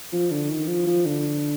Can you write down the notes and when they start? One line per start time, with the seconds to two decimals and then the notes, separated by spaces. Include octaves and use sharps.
0.13 F3
0.31 D3
0.50 D#3
0.68 F3
0.87 F3
1.05 D3